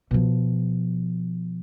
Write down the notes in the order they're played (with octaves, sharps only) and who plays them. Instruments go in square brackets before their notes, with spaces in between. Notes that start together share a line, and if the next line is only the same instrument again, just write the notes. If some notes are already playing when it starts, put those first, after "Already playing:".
[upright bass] B2 F3